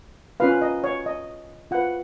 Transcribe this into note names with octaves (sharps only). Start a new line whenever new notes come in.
C#4 F4 B4 F5
D#5
C#5
D#5
F4 B4 F#5